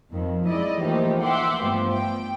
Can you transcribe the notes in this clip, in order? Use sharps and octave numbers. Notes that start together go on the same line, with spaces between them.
F2 D#3
G#3 E4 D5 D#5
E3 F3 A3 A#3 D#4 G4
E5 F#5 G5 C6 D6
G2 F3 A3 B3
G5